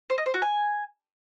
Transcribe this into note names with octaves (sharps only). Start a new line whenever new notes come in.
C5
D#5
C5
F#4
G#5